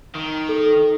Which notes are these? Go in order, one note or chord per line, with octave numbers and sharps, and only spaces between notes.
D#3
A4